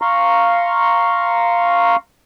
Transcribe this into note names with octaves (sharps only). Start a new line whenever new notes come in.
F5 A#5 C6 C#6